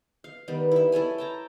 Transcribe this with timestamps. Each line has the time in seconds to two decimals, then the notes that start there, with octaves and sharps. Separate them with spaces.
0.24 F5
0.48 D#3 G3 B3
0.72 E4 E5
0.92 E4 A4 C#5 G#5
1.18 G5 A5 A#5